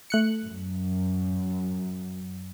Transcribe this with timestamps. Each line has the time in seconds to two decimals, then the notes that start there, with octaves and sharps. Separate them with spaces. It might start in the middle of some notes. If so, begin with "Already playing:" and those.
0.10 A3 F#6 C#7
0.44 F#2